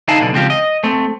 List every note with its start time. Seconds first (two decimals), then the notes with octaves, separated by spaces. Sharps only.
0.08 D3 D#4 E4 F5 G#5 A5
0.21 B1 B2 D3
0.33 C#2 F3 C4 G4 F5
0.50 D#5
0.84 A3 C4